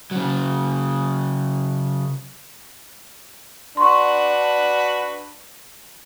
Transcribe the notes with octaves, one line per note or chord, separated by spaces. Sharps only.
C#3 F#3
D4 F#4 B4 C6 C#6